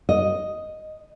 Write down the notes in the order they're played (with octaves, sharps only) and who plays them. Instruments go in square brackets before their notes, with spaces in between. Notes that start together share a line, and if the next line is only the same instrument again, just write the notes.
[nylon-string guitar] D#5